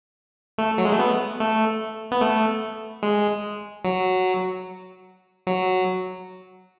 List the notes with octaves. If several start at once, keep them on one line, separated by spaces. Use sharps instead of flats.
A3
F#3
G#3
A3
B3
A3
B3
A3
G#3
F#3
F#3